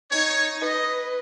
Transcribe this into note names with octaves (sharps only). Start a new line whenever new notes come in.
D#4 C#5
B4 D#5